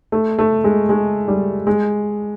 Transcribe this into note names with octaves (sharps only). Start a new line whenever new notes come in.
A3
A3
G#3
G#3
G3
G#3